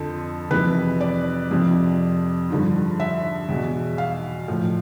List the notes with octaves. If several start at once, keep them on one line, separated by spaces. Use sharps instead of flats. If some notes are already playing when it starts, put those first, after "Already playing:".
Already playing: F2 D3 F3 A4
F2 C3 E3 B4
D5
F2 C3 F3
G2 D3 F3
E5
E2 B2
F5
A2 F3